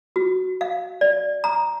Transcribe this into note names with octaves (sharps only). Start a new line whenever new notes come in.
F#4
F5
D5
A#5